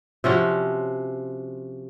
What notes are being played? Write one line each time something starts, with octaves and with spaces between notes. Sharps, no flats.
C3 F3 C#4 F#4